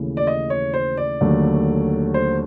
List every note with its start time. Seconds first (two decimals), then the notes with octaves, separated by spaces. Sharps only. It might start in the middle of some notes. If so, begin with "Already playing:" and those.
Already playing: D#2 C#3 E3 A3
0.17 D5
0.27 D#5
0.50 C#5
0.74 C5
0.97 D5
1.21 D#2 D3 F#3 A3
2.14 C5